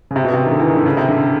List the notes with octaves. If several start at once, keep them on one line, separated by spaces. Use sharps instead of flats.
C#3
C3
B2
C3
D#3
D3
E3
D#3
D3
C#3
C3
D3